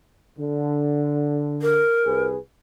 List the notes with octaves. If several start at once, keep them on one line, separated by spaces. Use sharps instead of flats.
D3
A#4
C2 G#4 B4